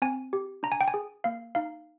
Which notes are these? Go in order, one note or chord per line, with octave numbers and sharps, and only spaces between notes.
C4 G#5
G4
D4 A#5
G#5
G5
G#5
G#4
A#3 F5
D#4 F5